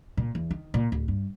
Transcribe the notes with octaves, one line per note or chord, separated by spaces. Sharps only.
A#2
E2
D#3
A#2
D1
G2